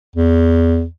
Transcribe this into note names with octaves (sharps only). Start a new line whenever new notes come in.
E2